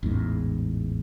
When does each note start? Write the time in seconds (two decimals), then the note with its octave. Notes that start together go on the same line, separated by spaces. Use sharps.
0.03 A1 E2 G#2